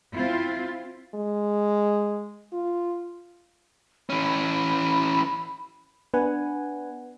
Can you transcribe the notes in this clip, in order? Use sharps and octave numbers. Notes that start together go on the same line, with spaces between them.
C4 E4 F4
G#3
F4
E3 C#4 B5
B3 D4 B4 F#5 G#5